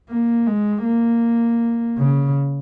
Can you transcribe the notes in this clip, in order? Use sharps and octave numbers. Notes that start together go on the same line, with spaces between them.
A#3
G#3
A#3
C#3